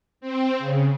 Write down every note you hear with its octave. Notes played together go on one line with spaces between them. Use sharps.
C4
C#3